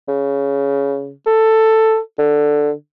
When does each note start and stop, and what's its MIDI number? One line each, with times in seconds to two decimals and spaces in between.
0.08 1.11 49
1.26 1.98 69
2.18 2.71 50